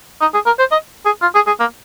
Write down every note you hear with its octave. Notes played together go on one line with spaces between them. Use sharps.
D#4
G#4
A#4
C5
D#5
G#4
F4
G#4
G#4
A#3